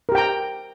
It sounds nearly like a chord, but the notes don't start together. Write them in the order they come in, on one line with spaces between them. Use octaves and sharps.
A#4 G4 G5 A#5